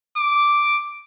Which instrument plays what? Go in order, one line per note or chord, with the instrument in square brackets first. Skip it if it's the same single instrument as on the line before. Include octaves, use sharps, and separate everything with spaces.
[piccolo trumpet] D6